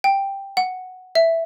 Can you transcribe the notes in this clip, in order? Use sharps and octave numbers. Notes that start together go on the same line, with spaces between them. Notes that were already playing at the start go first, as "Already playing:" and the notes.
G5
F#5
E5